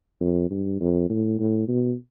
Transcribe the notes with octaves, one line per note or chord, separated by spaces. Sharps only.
F2
G2
F2
A2
A2
B2